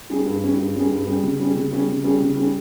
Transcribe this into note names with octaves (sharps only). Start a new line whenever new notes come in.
G3 C#4 G#4
G2
G3 C#4 G#4
G2
G3 C#4 G#4
G2
G3 C#4 G#4
C#3
G3 C#4 G#4
C#3
G3 C#4 G#4
C#3
G3 C#4 G#4
C#3
G3 C#4 G#4